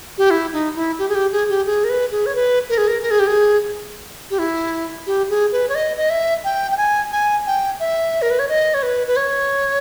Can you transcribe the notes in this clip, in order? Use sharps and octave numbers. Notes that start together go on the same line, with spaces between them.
G4
E4
D#4
E4
G4
G#4
G4
G#4
G4
G#4
A#4
B4
G#4
C#5
B4
A#4
G#4
A#4
A#4
G#4
G4
G#4
G4
E4
G4
G#4
B4
C#5
D#5
D#5
E5
G5
G5
G#5
G#5
G5
E5
A#4
B4
C#5
D#5
C#5
B4
B4
C#5